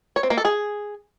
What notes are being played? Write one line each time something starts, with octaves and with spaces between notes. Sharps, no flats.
C#5
C4
A#3
A4
G#4